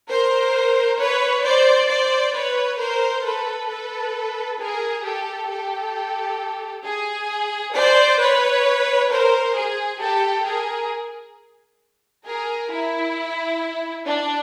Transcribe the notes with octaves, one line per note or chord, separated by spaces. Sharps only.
A#4 C5
B4 C#5
C5 D5
C5 D5
B4 C#5
A#4 C5
A4 B4
A4 B4
G#4 A#4
G4 A4
G4 A4
G#4
C5 D5
B4 C#5
A#4 C5
G#4
G4 A4
G#4 A#4
G#4 A#4
E4
D4